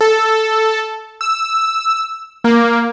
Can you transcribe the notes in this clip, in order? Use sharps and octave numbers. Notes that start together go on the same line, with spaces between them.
A4
E6
A#3